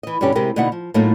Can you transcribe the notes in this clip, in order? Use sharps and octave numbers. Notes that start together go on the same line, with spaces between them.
E3 D#5
G2 B2 D3 C#4 G4
C3 G#3 E4 G4 A#4
B2 D3 A#3 D#4 E4 F#5
F3
A2 F#3 A3 A#3 D#4 F4